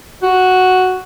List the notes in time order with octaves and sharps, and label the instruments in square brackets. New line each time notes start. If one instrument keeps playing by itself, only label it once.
[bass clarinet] F#4